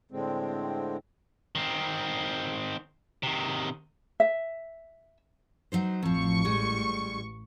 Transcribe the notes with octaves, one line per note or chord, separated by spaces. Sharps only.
A2 D3 G#3 C4
D#3 C4
C3 D#3
E5
F#3 D#4 C5
A1 F2 F3 C#6
G3 G#3